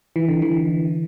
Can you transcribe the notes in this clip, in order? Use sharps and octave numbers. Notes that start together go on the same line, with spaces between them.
E3
D3
E3